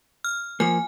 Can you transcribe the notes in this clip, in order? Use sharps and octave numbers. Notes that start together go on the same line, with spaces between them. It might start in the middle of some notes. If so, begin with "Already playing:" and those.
F6
F3 A#3 G#5